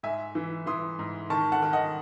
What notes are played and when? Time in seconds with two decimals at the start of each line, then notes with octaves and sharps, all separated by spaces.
0.03 G#2 E5 G#5
0.35 E3
0.66 E3 C6 D#6
0.99 G#2
1.30 D#3 A5 C#6
1.52 F#5 A5
1.62 D#3
1.73 D#5 F#5